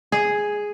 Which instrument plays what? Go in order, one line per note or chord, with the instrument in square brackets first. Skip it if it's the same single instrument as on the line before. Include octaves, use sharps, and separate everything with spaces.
[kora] G#4